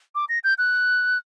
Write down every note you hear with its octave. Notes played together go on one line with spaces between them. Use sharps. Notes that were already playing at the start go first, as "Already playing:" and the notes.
D6
A#6
G6
F#6